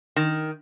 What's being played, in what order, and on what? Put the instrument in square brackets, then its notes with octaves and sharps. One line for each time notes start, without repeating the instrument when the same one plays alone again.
[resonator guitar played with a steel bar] D#3